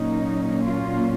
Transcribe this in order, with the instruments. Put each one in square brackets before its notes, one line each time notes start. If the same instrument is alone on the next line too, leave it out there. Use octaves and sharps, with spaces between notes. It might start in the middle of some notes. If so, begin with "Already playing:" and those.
Already playing: [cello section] A#2 F#3 A#3 C#4 D#4
F4